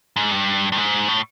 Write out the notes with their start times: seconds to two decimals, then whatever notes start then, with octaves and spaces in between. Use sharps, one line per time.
0.16 G#2
0.31 G2
0.72 G2
0.77 G#2
1.08 A2